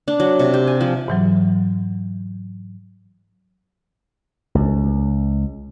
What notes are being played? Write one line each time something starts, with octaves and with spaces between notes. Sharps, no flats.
D4
F#3
C3
G4
G#5
F3
G#2 E3 F#3
C#2